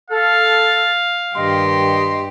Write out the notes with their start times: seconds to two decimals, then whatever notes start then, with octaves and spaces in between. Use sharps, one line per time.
0.10 A4 F5
1.36 G2 D#3 G4 D#5 C6